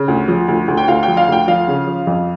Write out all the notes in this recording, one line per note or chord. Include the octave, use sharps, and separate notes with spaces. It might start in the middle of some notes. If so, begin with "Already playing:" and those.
Already playing: C#3
D2
F3
D2
D2
G5
D2 F5
G5
F3
F5
D2 G5
F3 F5
C#3
F3
F2